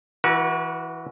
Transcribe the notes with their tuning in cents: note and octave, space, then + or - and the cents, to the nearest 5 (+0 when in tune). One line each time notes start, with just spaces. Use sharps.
E3 +0 F#4 +0 B4 -45